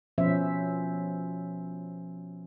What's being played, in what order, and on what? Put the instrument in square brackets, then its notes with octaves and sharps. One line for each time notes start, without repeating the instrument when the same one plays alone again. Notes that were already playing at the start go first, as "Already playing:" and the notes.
[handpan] B2 F3 B3 C#4 C5 E5